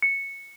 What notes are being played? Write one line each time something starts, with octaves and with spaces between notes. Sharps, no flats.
C#7